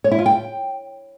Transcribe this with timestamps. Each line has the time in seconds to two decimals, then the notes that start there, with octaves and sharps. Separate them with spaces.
0.04 C#5
0.12 E4
0.19 F4
0.26 G5